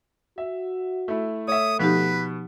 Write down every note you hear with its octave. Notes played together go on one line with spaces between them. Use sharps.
F#4 E5
A3 E4
A3 C#5 E5 D#6
B2 F3 D#4 G4 B4